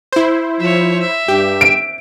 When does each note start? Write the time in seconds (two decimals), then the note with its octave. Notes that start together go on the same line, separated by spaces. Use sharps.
0.12 E4 C5
0.60 F3 C#5 E5
1.00 E5
1.28 G2 G4
1.61 D7